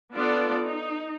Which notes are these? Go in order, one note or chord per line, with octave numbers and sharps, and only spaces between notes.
B3 D4 F4 A4 D5
D#4